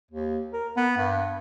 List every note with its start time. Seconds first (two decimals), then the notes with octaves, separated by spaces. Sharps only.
0.11 D#2
0.53 A#4
0.77 B3
0.97 G2